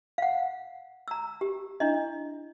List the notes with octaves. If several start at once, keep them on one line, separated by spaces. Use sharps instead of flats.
F5 F#5
A#5 E6
G4
D4 E4 D#5